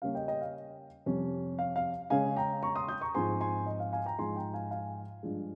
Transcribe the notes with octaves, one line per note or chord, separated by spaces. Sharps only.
C#3 G3 A#3 C#4 F5
D#5 G5
D#5 G5
F5
F2 C3 G3 C#4
F5
F5
C#3 G#3 C#4 F5 G#5
G5 A#5
A#5 C#6
C6 D#6
D#6 G6
A#5 C#6
G#2 F3 G#3 C4 G#5 C6
G#5 C6
D#5
F5
F5 G#5
G5 A#5
G#2 F3 G#3 G#5 C6
G5 A#5
F5 G#5
F5 G#5
G2 F3 G#3